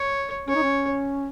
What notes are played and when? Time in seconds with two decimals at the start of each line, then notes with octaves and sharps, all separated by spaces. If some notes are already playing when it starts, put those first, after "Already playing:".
Already playing: C#5
0.47 C#4 C#5
0.55 D#4
0.63 C#4